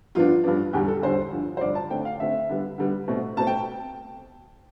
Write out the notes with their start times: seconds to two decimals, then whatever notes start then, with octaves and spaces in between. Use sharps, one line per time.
0.15 G2 F3 B3 D4 F4
0.44 G2 F3 B3 D4
0.73 E2 D3 G3 G4
0.88 A4
1.02 E2 D3 G3 C5
1.32 G2 D3 F3
1.57 C5
1.61 G2 D3 F3 D5
1.75 A5
1.90 D3 A3 C4 G5
2.05 F5
2.20 D3 A3 C4 E5
2.49 D3 G3 B3
2.78 D3 G3 B3
3.08 B2 A3 C4
3.37 B2 A3 C4 A5
3.47 G5